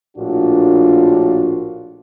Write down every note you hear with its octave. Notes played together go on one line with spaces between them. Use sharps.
A#1 A2 D4 F4 F#4